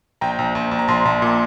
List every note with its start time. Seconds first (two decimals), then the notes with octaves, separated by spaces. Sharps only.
0.21 A#1 G5 A#5
0.39 A#1
0.55 A#1
0.71 A#1
0.79 A#5
0.88 A#1 A5 C6
1.05 A#1
1.22 A#2